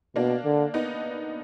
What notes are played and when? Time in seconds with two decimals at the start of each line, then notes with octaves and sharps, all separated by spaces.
0.16 B2 A#3 D4
0.45 D3
0.74 B3 D#4